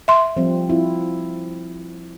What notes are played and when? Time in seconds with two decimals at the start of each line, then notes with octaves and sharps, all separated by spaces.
0.08 E5 C6
0.37 F3 G3 C4
0.69 C4 E4 F4